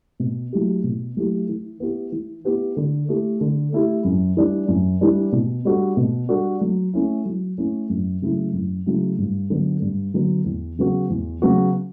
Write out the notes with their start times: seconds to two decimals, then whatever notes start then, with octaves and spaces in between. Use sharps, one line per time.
0.20 B2
0.52 F#3 A3 E4 G4
0.84 B2
1.17 F#3 A3 E4 G4
1.49 E3
1.80 B3 E4 G4
2.12 E3
2.45 B3 E4 G4
2.77 D3
3.08 A3 E4 G4
3.41 D3
3.72 A3 E4 G4
4.05 F#2
4.37 E3 G3 D4
4.68 F#2
5.01 E3 G3 D4
5.32 B2
5.65 G3 D4 F#4 A4
5.97 B2
6.29 G3 D4 F#4 A4
6.61 F#3
6.94 A3 C#4 E4
7.26 F#3
7.58 A3 C#4 E4
7.90 F#2
8.22 C#3 F#3 A3 E4
8.53 F#2
8.86 C#3 F#3 A3 E4
9.18 G2
9.50 D3 F#3 B3
9.82 G2
10.14 D3 F#3 B3
10.45 E2
10.79 C#3 F#3 B3 F#4
11.10 E2
11.42 C#3 F#3 B3 F#4